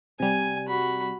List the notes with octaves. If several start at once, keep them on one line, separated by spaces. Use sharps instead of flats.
C3 G3 G#5
F#4 B5